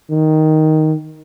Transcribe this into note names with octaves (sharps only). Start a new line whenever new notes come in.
D#3